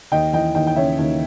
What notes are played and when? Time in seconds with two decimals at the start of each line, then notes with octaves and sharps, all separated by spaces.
0.12 D#2 D#5 G5
0.33 E3 D#5 G5
0.55 D#2 D#5 G5
0.67 G5
0.76 C#3 C#5 E5
0.98 D#2